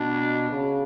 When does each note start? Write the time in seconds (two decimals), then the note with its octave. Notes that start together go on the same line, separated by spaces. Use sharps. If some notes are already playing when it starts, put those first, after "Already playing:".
Already playing: B2 D4
0.52 C#3